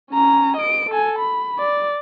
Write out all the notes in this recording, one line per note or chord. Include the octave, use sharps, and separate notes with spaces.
C#4 A#5
D#5 D7
A4 G#5
B5
D5